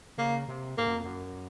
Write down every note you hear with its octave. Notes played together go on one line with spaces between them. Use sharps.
C#3 A#3
C3
G#2 A#3
F#2
F2
F#2